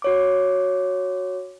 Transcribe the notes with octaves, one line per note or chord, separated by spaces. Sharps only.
F#4 C#5 D6